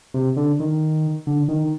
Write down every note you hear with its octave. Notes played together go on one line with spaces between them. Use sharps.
C3
D3
D#3
D3
D#3